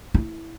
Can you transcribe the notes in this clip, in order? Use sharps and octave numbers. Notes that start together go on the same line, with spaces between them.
E4